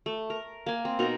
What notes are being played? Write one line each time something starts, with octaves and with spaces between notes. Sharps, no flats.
A3
A#4
A#3 G#5
C4
B2 D#4 A#4